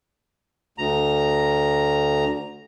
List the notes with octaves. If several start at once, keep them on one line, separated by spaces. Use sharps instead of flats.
D2 A#5